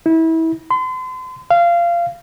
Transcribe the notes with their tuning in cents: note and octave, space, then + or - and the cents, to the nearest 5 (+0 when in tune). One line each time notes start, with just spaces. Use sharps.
E4 -25
C6 -40
F5 -20